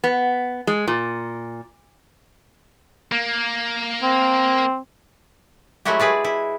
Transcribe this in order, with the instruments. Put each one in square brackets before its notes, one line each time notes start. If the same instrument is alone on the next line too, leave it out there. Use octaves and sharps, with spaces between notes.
[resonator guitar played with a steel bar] B3
G#3
A#2
[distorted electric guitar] A#3
[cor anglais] C4
[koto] F#3 G#3 A3 E4 F#4 G4
E4 G#4 B4 D5
E4